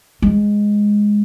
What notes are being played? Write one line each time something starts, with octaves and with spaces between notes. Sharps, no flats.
G#3